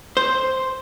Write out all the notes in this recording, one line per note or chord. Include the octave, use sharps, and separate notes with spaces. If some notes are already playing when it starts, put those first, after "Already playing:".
C5